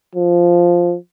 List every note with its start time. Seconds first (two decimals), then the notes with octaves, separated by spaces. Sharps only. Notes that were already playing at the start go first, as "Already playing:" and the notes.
0.15 F3